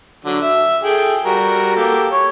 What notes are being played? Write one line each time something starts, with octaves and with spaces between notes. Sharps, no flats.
D3 F#3
E5
G#4 A4 G5
G3 F#4 A#4
A#3 G4 A4
C#5